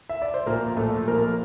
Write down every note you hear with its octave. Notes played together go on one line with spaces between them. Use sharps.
E5
D5
C5
A#1 A#3 A#4
A#1 A3 A4
F3 A#3 A#4